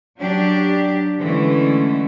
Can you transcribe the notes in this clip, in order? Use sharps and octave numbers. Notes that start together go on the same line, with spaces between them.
F#3 D4 G4
D3 E3 G#3 A3 C#4